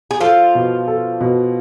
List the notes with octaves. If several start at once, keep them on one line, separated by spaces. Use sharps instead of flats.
G#4
F3 F4 A4
B2
A4
B2